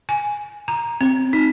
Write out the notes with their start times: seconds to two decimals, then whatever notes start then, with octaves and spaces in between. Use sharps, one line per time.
0.09 G#5
0.68 A#5
1.01 C4
1.33 D#4